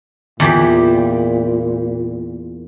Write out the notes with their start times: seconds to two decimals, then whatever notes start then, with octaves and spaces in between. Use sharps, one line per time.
0.40 E2 A#2 E3 G4